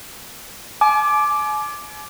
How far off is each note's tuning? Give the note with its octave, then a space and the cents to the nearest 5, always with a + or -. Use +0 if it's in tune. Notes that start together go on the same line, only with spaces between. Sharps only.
G#5 +45 D6 +5